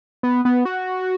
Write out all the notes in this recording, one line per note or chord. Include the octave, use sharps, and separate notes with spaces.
B3
B3
F#4